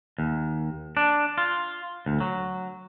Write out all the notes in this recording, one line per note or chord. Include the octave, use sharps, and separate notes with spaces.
D#2
D4
F4
D2
F#3